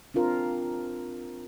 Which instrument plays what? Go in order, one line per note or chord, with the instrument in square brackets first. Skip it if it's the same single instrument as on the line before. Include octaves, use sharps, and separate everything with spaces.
[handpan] C4 D4 F4 A#4